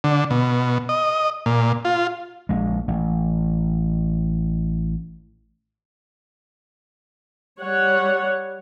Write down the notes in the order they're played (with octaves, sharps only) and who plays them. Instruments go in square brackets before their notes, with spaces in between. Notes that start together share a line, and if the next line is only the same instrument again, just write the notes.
[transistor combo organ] D3
B2
D#5
A#2
F4
[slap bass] A#1 G#3
A1
[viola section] G3 C#5 F#5